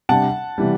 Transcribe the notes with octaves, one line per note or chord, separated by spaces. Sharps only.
C3 G3 D4 F#5 A5
C3 E3 G3